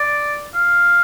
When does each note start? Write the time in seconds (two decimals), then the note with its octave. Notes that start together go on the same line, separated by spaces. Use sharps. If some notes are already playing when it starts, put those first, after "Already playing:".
Already playing: D5
0.55 F5